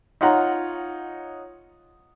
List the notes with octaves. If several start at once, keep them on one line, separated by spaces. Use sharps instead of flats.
D#4 F4 C#5 F#5 A#5